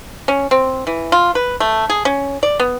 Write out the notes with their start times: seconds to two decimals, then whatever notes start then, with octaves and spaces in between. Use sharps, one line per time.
0.28 C#4
0.51 C4
0.87 E3
1.12 F4
1.35 B4
1.60 A3
1.90 G#4
2.05 C#4
2.43 D5
2.60 B3